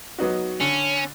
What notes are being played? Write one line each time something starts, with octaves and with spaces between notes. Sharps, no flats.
F#3 B3 D#4 F#4
D3 C#4